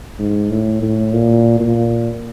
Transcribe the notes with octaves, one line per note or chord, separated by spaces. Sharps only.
G#2
A2
A2
A#2
A#2